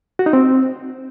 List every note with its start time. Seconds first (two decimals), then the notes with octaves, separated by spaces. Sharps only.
0.19 F#4
0.26 D#4
0.33 C4